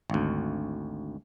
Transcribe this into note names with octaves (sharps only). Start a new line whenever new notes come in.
G#1 D2